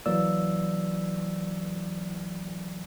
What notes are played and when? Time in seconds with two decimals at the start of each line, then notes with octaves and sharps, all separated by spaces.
0.06 E3 F#3 A#3 D5 E6